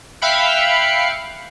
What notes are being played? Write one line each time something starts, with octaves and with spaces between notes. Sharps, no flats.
E5 F5 G5 B5 F#6 C#7